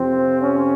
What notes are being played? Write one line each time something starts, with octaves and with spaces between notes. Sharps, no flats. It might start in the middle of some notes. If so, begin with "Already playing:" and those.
Already playing: F2 C3 F3 C4
C#4